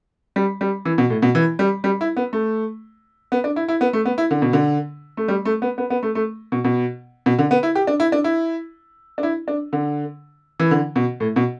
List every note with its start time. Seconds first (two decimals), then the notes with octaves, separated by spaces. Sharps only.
0.36 G3
0.61 G3
0.85 E3
0.98 B2
1.10 A2
1.22 B2
1.35 E3
1.59 G3
1.84 G3
2.01 E4
2.17 B3
2.33 A3
3.32 B3
3.44 D4
3.56 E4
3.68 E4
3.81 B3
3.93 A3
4.05 B3
4.18 E4
4.31 D3
4.42 B2
4.53 D3
5.17 A3
5.28 G3
5.45 A3
5.62 B3
5.78 B3
5.90 B3
6.03 A3
6.15 A3
6.52 B2
6.64 B2
7.26 B2
7.39 D3
7.51 B3
7.63 E4
7.75 G4
7.87 D4
8.00 E4
8.12 D4
8.24 E4
9.18 D4
9.23 E4
9.48 D4
9.73 D3
10.60 E3
10.71 D3
10.96 B2
11.20 A2
11.36 B2